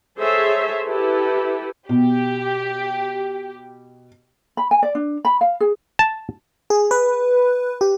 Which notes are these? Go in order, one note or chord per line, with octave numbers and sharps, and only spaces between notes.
G#4 A4 C5 C#5 E5
E4 G4 A4 B4
B2 G4
B5
G#5
D5
D4
B5
F5
G#4
A5
G#4
B4
G4